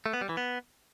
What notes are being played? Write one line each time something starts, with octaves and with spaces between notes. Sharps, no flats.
A3
B3
G3
E3
B3